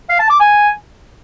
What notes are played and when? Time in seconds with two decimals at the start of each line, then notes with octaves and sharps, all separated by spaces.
0.09 F5
0.20 A5
0.30 D6
0.40 G#5